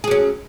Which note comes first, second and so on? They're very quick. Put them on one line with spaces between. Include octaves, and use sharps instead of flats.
G#4 F#3 C#4